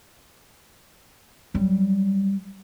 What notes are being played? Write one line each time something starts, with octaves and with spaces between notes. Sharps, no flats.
F#3 G3